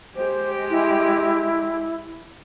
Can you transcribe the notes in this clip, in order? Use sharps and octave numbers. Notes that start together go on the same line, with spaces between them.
G#3 G4 C5
E4